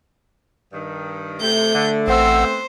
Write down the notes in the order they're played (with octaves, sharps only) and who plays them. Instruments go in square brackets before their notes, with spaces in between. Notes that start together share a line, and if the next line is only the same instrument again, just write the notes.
[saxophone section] G2 D#3
[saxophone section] C3 [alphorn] A3 [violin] G6
[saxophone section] D3
[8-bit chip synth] A1 F#5 E6 [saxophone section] B3 C4 [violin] C5